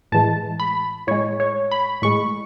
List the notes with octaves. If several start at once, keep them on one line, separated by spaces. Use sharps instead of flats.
A2 E3 G#3 A5
B5
A2 G#3 C#5
C#5
B5
A2 G#3 C#6